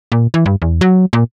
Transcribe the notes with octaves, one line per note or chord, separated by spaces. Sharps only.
A#2
E3
G2
E2
F#3
A#2